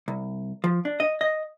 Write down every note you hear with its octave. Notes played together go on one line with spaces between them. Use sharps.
C2
F3
D4
D#5
D#5